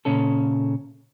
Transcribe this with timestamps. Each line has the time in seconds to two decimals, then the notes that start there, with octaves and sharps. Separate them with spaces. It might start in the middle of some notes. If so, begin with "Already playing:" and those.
0.05 A#2 C#3 C#4 A4